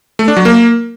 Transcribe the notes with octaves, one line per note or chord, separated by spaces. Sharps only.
A3
D4
F#3
A#3